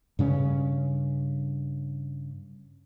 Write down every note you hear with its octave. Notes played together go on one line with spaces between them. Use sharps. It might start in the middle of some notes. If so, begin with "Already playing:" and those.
G2 C#3 C4 C#4